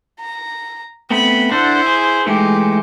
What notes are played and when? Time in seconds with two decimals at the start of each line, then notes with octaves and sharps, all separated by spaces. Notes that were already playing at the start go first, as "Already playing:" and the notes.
0.20 A#5
1.11 A3 B3 C4 B5
1.52 D4 E4 A4 C5 F#5
1.86 G#4
2.27 E3 G#3 A3 D#4 G4